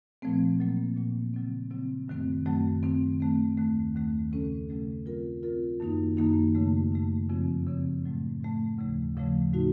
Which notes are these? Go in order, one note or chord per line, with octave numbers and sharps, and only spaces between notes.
A#2 F3 A3 C4
A#2 F#3 A#3
A#2 F#3 A#3
C#3 F#3 C4
C#3 F#3 C4
F#2 D#3 F#3 A3 C4
F#2 D#3 F#3 A3 C4
D#3 A3 C4
D#3 A3 C4
D#2 D#3 A3
D#2 D#3 A3
C#3 F#3 A3 C#4 A4
C#3 F#3 A3 C#4 A4
F#3 C4 F4 A#4
F#3 C4 F4 A#4
F#2 D#3 A#3 D#4
F#2 D#3 A#3 D#4
F#2 C#3 A3
F#2 C#3 A3
F2 C#3 F3 C4
F2 C#3 F3 C4
A2 F#3 A3
A2 F#3 A3
D#2 C#3 F3 A3
D#2 C#3 F3 A3
A2 A3 D#4 F#4